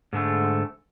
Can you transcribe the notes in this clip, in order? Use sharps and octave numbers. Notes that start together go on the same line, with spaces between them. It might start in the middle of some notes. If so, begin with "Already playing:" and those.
G#2 D3 G#3 A3